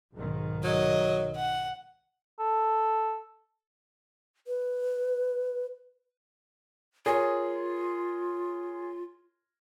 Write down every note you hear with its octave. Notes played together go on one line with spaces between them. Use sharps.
B1 G#2 D#3
F#3 D#5
F#5
A4
B4
F4 G#4 A#4 C#5